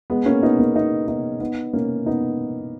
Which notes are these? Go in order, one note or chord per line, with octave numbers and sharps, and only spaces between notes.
G#3 B3
A#3 C#4
B3 D#4
A#3 C#4
B3 D#4
B3 D#4
B3 D#4
A#3 C#4
B3 D#4